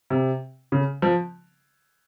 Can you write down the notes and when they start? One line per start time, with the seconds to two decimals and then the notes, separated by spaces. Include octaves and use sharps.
0.10 C3
0.72 C#3
1.02 F3